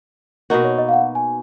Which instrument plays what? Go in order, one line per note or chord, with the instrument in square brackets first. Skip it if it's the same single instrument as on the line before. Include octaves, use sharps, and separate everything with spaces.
[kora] B2 A#3 D#4 F#4 [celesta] A#4
[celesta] C#5
D#5
F5
F#5
G#5